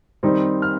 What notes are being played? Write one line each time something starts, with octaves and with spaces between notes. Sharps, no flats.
D#3 G3 C4 D#4
F6